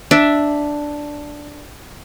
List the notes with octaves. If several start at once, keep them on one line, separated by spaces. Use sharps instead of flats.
D4 E5